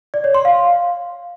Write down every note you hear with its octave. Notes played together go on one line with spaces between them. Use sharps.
D5
C#5
C6
F5